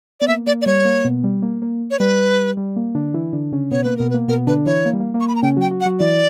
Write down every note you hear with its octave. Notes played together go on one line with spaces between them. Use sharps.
B3 D5
A#3 E5
A#3 D5
D5
G3 C#5
A#3
B2 B3
G3
A#3
A#3
C#5
G3 B4
G3
A#3
D3 D4
E3 E4
D3 D4
C#3 C#4
B2 B3 C#5
A#3 B4
B2 B3 A#4
B4
A#3
B2 B3 A#4
D3 D4 B4
E3 E4 C#5
A#3
G3
A#3
A#3
C#6
B5
A#5
C#3 C#4 G5
F#3 F#4 G5
F#3 F#4
F#5
F#3 F#4
E3 E4 D5